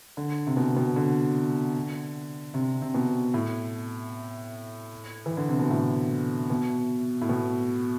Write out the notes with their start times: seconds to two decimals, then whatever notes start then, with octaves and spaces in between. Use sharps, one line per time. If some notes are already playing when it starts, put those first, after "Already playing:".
0.17 D3
0.47 C3
0.57 B2
0.76 B2
0.96 D3
2.54 C3
2.82 C3
2.94 B2
3.34 A2
5.26 E3
5.37 D3
5.48 C3
5.59 B2
5.71 A2
6.50 B2
7.21 A2
7.29 B2